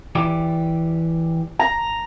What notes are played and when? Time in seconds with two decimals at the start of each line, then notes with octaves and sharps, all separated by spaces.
0.15 E3 G4 D5
1.59 A#5